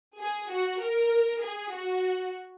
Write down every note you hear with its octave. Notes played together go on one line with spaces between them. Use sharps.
G#4
F#4
A#4
G#4
F#4